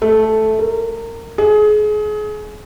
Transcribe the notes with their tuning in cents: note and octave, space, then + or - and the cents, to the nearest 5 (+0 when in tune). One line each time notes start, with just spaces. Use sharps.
A3 -5
A#4 -25
G#4 +30